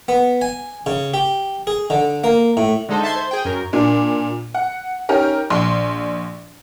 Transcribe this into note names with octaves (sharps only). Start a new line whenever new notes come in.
B3
G#5
C#3
G4
G#4
D3
A#3
A2
D3 G#3 D#4 A4 C5
E5 A5 C6 G#6
C5
G#4 G5
F#2 A#4
A#2 D4
F#5
C#4 D#4 G4 A#4
A#1 C6